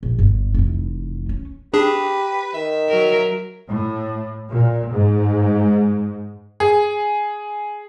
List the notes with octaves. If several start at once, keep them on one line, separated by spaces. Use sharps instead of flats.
A#1
G1 G2
F1 E3
C#4
D4 G4 G#4 B4
D#3 E5
F#3 A#4
A2
A#2
G#2
G#4